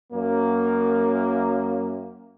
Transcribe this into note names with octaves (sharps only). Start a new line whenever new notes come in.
F#2 A#3